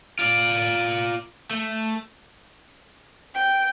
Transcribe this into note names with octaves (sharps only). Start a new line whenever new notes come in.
F4 D5
A3
G5